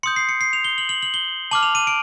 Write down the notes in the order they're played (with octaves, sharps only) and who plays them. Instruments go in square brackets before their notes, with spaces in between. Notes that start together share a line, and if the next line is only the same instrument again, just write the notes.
[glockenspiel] C6 D#6 G6 C#7
C7
C#7
C7
F7
G7
F#7
F#7
F#7
G7
A5 D6 F6 F#7
F7
D#7
D7